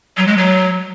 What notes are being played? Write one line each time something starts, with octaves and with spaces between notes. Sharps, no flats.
F#3
G#3
F#3